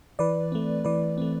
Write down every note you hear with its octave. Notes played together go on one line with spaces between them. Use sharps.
E3 B4 D5
A3 C4
E3 B4 D5
A3 C4